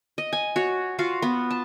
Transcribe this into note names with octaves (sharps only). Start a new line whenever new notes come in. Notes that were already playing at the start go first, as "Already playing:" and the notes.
D#5
G#5
F#4 C#5
F4 F#4 F5
B3
A5